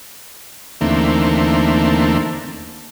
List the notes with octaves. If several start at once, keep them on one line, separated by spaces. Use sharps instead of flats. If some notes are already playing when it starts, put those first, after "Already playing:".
D#2 D3 E3 A3 A#3 C4